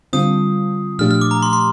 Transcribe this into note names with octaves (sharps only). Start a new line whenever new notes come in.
D3 G3 C4 F4 D#6
A#2 F3 A3 D4 G4 F6
F6
D6
A#5
C6
C6